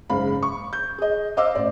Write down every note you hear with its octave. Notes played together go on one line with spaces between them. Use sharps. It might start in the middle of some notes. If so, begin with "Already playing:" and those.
F#1 G#2 F5 B5
C#6
G6
G#4 D#5
C5 D#5 F5 D6 E6
A1 C5 D5